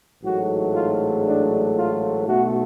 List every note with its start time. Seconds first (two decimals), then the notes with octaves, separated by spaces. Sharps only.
0.22 A1 G#2 F#3 A3 F#4
0.74 F4
1.26 D4
1.76 F4
2.27 B1 B2 A3 F#4